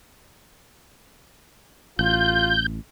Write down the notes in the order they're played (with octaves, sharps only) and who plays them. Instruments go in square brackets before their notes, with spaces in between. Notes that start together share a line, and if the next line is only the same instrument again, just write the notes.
[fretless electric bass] A1 [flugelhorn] F4 [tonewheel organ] G6